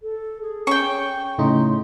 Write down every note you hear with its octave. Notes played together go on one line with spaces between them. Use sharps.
A4
G#4
C#4 G5 C#6
A2 C#3 D#4 C6